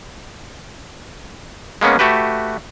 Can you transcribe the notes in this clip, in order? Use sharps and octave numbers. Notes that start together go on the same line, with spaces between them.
G#3 A#3 B3 C#4
A3 F#4 G4 B4